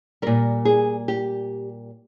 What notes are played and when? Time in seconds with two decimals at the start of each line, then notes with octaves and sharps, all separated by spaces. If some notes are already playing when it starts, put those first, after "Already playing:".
0.22 A#2 G3 A#4
0.65 G#4
1.08 G4